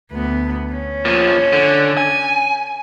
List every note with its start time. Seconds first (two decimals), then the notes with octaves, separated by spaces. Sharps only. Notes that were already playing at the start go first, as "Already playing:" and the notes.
0.12 D2 B3
0.73 C#4
1.05 A#2 F3
1.53 D3
1.97 G#5